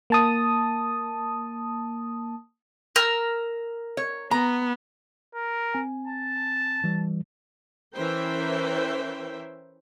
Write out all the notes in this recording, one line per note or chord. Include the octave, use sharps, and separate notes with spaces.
A#3 A5 D#6
A#4 E6
C#5
B3 A#5
A#4
C4 G#5
A5
E3 G3
E3 C#4 A#4 C5 E5 G5